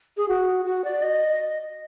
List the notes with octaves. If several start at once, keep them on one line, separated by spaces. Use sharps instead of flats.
G#4
F#4
F#4
D5
D#5